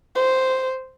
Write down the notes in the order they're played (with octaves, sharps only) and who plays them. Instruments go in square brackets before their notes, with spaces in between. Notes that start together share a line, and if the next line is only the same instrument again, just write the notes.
[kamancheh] C5